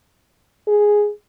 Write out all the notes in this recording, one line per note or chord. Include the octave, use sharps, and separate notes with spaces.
G#4